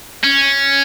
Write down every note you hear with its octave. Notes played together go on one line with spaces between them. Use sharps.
C#4